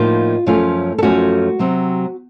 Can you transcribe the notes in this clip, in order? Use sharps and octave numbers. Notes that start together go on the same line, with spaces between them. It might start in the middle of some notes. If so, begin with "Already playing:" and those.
Already playing: A2 F3 A#3 D#4 F4
F#2 F3 A3 C#4 F4
A4
F#2 F3 A3 C#4 F4 F#4
C3 F#3 C4